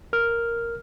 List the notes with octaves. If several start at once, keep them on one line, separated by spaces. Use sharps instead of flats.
A#4 F6